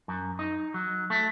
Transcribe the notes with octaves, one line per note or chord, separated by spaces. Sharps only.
F#2
D#4
F#3
A3